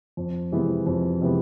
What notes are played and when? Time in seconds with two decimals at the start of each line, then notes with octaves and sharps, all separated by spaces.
0.17 F2
0.52 C3 E3 G#3 B3
0.86 F2
1.22 C3 E3 G#3 B3